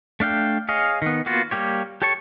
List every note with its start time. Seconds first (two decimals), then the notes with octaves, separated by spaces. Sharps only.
0.20 A3 D4 F5 G5
0.69 G#4 C#5 D#5 F5
1.02 D#3 B3
1.26 A#3 B3 F4 F#4
1.51 G3 A#3 G4 C#5
2.02 G4 A4 C#5 A5 C#6